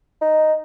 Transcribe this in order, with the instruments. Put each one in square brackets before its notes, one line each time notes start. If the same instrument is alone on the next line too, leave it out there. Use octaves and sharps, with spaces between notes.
[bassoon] D#4